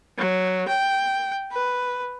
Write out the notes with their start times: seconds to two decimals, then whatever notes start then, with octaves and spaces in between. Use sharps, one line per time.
0.18 F#3
0.68 G5
1.52 B4